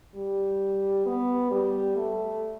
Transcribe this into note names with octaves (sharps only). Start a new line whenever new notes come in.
G3
B3
G3
A3